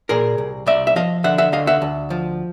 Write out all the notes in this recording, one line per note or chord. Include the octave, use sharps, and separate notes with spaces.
A#2 G#4 A#4
C2
C2 D5 E5
E5
F3 D#5 F5
D3 E5 F#5
E5 F#5
D2 D#5 F5
E5 F#5
D2
F3